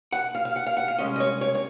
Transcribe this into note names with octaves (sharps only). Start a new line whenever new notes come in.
F#5
F5
F5
F#5
F5
F#5
F5
C2 A#2 G#3 C#4 D#5
D#5
C#5
C#5
C#5